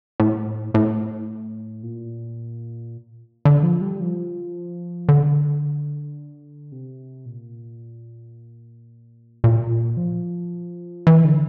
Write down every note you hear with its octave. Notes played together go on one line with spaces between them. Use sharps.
A2
A2
A#2
D3
F3
G3
F3
D3
C3
A#2
A#2
F3
E3
D3